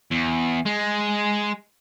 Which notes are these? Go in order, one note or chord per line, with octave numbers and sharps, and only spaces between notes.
E2
G#3